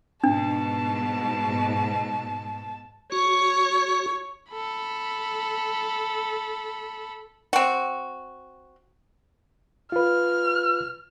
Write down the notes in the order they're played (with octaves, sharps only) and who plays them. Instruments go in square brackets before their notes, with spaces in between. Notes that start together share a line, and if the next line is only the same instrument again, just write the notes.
[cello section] G#2 B2 [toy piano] D4 [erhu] A5
[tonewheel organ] F#4 [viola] C#5
[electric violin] A4 B5
[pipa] C4 F#4
[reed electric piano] F4 B4 [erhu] F6